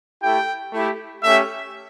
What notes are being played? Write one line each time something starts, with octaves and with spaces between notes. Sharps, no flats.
A3 E4 G4 G5
A3 E4 G4
A3 C#4 G4 E5